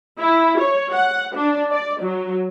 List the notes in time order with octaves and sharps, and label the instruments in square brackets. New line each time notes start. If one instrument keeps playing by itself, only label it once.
[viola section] E4
C#5
F#5
D4
D5
F#3